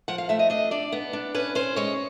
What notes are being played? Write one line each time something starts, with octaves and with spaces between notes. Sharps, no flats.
F3 F#5
F5
A3 E5
D#5
D4 D#5
D4 D5
B3
D4
C#4 B4
C#4 C5
G#3 C#5